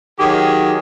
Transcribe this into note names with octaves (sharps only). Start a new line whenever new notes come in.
D#3 F#3 G4 G#4